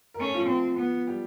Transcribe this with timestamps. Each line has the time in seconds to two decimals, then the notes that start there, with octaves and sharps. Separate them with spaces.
0.14 A#4
0.19 A3 C#4 A4
0.34 F3 F4
0.48 C4
0.77 B3
1.07 G3 G4